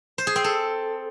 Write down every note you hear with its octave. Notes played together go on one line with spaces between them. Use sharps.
C5
G#4
C4
A4